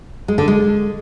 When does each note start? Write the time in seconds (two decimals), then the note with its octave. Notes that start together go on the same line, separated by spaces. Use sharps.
0.28 G#3
0.38 D3
0.48 G#3